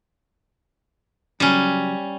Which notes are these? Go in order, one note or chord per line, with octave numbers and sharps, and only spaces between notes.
C#3 F#3 G3 C#4